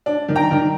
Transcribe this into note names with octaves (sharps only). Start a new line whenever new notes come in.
D4
D#3
G5 A#5
D#3